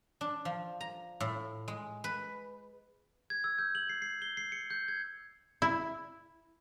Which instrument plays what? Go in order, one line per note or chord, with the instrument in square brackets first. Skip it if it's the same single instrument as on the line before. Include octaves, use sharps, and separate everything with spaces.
[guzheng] D4
F3
A#5
A2
G#3
B4
[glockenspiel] G#6
E6
G6
F#7
C7
C7
G7
C7
C#7
G6
G#6
[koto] E4